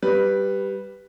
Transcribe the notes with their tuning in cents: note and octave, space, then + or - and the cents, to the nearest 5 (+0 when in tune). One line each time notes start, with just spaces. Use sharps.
G3 +0 B4 +0